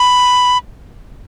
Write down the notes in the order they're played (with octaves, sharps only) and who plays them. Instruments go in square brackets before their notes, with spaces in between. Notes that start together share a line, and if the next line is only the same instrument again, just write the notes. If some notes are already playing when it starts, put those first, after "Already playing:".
Already playing: [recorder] B5